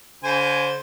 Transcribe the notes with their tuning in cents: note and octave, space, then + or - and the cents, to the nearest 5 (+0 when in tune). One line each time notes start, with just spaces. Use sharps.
D3 -45 C5 +0 G#5 +0